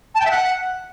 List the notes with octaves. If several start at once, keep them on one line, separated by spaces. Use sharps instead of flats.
A5
G5
E5
F#5